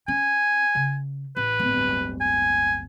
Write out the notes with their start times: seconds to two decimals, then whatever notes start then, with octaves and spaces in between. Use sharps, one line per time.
0.08 C#4 G#5
0.75 C#3
1.37 A1 B4
1.60 D1 G1
2.21 G#5